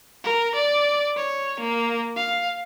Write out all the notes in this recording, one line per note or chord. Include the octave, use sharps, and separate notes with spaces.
A#4
D5
C#5
A#3
F5